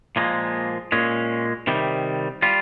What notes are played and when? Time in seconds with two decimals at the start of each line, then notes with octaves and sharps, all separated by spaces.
0.16 A#2 F3 G#3 A#3
0.92 A#2 G#3 C#4
1.67 C3 D#3 G3
2.42 G3 F4